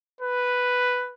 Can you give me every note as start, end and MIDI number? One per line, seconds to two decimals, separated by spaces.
0.21 1.13 71